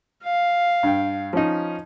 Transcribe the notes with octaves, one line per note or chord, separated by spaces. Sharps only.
F5
G2 G5
F3 C#4 D#4